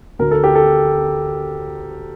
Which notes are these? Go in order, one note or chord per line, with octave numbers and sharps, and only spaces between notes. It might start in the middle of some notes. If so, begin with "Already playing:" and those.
D2 D3 A#4
A4
G4
A4